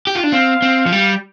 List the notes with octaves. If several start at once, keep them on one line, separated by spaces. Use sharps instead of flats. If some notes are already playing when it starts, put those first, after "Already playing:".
G4
F4
D4
C4 F5
C4
F3
G3